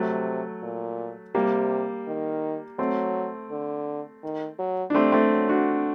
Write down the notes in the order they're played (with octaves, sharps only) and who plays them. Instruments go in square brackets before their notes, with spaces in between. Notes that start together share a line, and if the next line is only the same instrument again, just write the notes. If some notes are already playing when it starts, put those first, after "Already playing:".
Already playing: [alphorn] C3 [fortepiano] F#3 A3
[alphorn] A#2
[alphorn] C3 [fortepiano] G3 A#3
[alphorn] D#3
[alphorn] F#3 [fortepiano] A3 C4
[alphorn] D3
D#3
F#3
[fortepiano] D4
[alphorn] G3 [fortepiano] A3 C4
[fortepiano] A3 C4
[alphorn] F#3
[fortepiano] D4 F#4